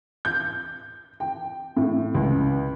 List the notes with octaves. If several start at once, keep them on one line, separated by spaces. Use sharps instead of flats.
G6
G5
A2
C#2